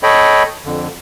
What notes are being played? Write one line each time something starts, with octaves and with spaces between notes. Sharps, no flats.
A4 C#5 D#5 G5 B5
F2 D3